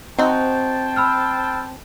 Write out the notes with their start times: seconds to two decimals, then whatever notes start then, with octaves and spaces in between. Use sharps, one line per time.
0.18 C4 D#4 F#4 C5 G5 A5
0.96 B5 E6 F6